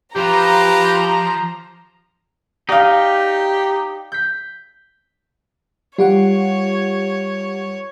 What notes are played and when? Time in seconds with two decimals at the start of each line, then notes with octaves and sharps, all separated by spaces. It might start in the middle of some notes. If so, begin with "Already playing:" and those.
0.16 F3 F4 G4 B4 A#5
2.69 D#4 G4 D5 F5
4.12 G6 B6
5.98 G3 F4 G4 C#5 F#5